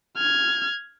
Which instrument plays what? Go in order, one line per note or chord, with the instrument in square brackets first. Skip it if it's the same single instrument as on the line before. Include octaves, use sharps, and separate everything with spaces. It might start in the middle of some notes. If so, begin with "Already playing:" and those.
[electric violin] F6 G#6